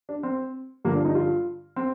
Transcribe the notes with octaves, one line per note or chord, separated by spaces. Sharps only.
D4
C4
G2 D3 F3 A#3
D4
D#4
F4
C4